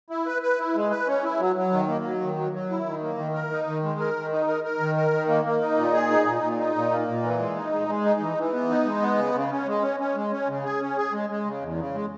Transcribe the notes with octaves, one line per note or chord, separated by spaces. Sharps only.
E4
B4
B4
E4
G#3
B4
C#4
E4
F#3
F#3
D#3
A#3
F#3
D#3
F#3
F#3
E4
D#3
A#3
D#3
A#4
D#4
D#3
G#3
A#4
D#3
D#4
A#4
A#4
D#3
A#4
D#3
A#3
A#3
D#4
A#2
G#4
D#4
A#2
A#2
D#4
A#2
A#3
A#2
E3
G#3
D#4
G#3
G#3
D#4
E3
E3
B3
D#4
G#3
B3
C#3
C#3
C#4
G#3
C#4
C#4
G#3
C#4
C#3
G#4
C#4
G#4
G#3
G#3
C#3
E2
C#3
G#3